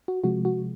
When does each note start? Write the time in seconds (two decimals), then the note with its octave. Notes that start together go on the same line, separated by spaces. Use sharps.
0.08 F#4
0.24 C3 F3 G#3 F#4
0.45 F#4